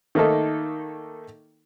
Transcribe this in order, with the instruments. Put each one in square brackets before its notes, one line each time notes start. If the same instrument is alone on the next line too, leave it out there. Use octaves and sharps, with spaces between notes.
[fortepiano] D#3 A3 A#3 D#4 A4